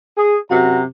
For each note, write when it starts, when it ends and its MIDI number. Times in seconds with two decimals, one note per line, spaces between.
0.17 0.38 68
0.51 0.83 42
0.51 0.83 48
0.51 0.83 66
0.51 0.83 82